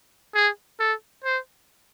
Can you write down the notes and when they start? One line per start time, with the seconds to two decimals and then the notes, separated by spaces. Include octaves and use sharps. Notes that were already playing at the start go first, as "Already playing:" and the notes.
0.35 G#4
0.80 A4
1.25 C5